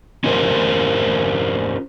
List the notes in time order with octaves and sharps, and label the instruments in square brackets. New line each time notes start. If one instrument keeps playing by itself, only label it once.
[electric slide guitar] C#4 F4 G4 A#4 C5